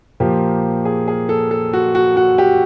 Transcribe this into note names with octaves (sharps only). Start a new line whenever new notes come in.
A#2 F3 A#3 G4
G#4
G#4
A4
A4
F#4
F#4
F#4
G4